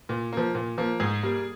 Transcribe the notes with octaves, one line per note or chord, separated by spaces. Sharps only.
A#2
F3 A#3
A#2
F3 A#3
G#2 G#4
G3 A#3